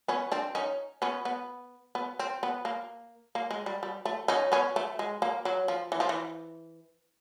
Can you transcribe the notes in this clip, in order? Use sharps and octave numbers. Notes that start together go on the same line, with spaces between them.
B3 C#4
C4 D4
C#4 D#4
B3 C#4
B3
B3
C4
B3
A#3
A#3
G#3
G3
G3
A3
C#4 D#4
B3 C#4
A3
G#3
A#3
F#3
F3
E3
F3
E3